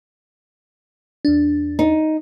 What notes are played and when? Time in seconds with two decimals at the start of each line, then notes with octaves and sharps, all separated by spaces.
1.25 E2 D4
1.79 D#4